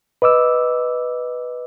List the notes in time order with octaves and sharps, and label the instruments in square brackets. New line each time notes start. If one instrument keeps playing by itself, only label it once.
[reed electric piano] B4 D#5 D6 E6